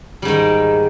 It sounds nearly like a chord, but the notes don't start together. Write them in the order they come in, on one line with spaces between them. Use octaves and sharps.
G3 G#2 D#3